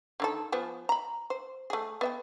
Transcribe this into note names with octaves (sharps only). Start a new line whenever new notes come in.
D3 D#3 A4
F3 B3 G#5
A#5 B5
C5
A3 G#4
B3 E5 G5